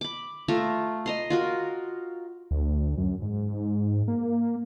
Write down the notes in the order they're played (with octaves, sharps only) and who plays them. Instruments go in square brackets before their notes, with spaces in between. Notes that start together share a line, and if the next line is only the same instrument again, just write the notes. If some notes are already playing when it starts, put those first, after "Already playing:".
[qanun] B5 D6
A3 F4 E5 A#5
D#5 A#5 C6
F4 F#4 A#4
[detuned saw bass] D2
F#2
G#2
A#3